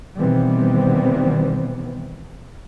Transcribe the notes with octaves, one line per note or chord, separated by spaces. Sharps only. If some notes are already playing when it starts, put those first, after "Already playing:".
B2 D#3 E3 G3 B3 C4